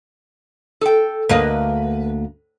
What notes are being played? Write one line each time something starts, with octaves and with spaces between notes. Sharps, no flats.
A4 G5
D2 A#3 B4 D#5